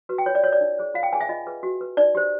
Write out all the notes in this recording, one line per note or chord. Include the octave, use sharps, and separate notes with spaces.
F#4 B4
G5
F4 C#5
D5
A#4 C#5
D5
D#4
G#4 C5
F4 F5
G5
G#4 B4 G#5
E5
F4 D#5
G#4 B4
F#4
B4
D#4 D5
G4 C5